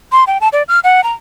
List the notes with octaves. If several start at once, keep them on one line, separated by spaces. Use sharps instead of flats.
C6
G5
A5
D5
F6
F#5
A#5